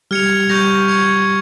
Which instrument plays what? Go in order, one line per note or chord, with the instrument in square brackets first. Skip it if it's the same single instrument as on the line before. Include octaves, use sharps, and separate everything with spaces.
[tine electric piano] G3 G4 [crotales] F6 G#6 C#7 F7
[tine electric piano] G3 G4 [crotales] C#6 G6 A#6 F7
[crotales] C#6 G#6 C#7 F7